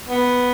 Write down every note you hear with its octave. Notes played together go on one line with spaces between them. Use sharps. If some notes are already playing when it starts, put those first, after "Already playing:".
B3